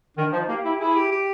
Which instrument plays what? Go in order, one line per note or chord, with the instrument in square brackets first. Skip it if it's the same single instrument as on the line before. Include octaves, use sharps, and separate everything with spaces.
[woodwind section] D#3 [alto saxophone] D4
[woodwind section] F3 [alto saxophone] D#4
[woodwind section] A#3 [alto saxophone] G4
[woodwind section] E4
[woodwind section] E4 [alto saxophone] G#4
[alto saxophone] G4
G4